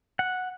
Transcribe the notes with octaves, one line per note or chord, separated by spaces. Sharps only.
F#5